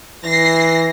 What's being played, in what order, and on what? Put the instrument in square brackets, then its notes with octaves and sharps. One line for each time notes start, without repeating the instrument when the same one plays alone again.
[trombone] E3 [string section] A#6 C7